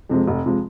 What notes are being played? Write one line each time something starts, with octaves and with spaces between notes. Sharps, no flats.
F2 C3 F3 G#3
F1
C3 F3 G#3